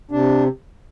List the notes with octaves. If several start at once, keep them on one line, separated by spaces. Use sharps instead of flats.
C3 D4